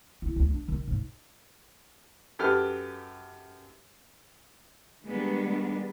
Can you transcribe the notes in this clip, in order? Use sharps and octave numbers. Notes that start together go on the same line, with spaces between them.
E4
D2
D4
D#3
G#2
F#2 G4 A4 B4 F6
D#3 G3 G#3 B3 D4